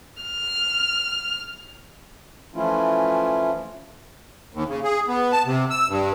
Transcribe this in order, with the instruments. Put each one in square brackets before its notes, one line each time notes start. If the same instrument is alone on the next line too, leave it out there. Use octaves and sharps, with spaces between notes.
[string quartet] F6
[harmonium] E3 F3 A3 C#4 E4 F4
[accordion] D#2
C#3
G#4
B3
A5
C3
E6
G2